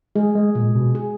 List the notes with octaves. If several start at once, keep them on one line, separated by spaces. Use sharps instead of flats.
G#3 G#4
G#3
A#2 G#3
B2
G#4